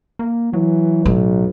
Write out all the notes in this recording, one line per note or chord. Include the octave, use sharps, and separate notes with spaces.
A#3
E3 F#3
B1 A2